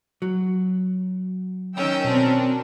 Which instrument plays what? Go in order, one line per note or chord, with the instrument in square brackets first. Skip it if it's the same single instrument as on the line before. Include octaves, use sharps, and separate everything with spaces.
[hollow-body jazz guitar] F#3
[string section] D#3 G5 E6 [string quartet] C#4
[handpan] B2 [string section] C4 D4 A#4